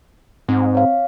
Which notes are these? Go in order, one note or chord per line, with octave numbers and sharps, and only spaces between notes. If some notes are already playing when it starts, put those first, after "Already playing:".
G#2 C4
C#5 F5